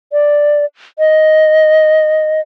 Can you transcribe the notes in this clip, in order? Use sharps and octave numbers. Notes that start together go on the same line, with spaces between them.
D5
D#5